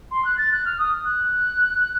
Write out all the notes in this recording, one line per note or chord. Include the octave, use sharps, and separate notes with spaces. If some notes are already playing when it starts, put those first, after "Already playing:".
C6
F#6
A6
F#6
F6
D#6
F#6